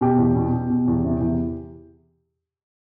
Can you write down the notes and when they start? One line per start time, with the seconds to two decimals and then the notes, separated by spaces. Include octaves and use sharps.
0.01 B2 G4
0.19 E2
0.35 B2
0.53 B2
0.70 B2
0.88 E2
1.04 C3
1.21 E2